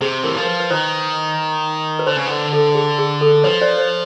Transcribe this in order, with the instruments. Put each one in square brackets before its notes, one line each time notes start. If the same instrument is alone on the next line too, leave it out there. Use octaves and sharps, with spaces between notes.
[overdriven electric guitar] C3 [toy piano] G#4
[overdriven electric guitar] E3 [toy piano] A#4
[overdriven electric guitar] F3 [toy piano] A#4
[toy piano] B4
B4
[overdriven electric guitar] D#3 [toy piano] C5
[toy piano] B4
[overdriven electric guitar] D3 [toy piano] C5
[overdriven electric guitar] C#3
D3
[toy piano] A4
G#4
G#4
A4
[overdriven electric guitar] F3 [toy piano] B4 C#5
[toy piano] C5 D5
C5